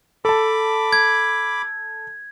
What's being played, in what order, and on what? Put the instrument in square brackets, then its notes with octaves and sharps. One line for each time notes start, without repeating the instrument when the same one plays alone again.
[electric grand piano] A4 A5 [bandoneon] B5 D6
[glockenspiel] G#6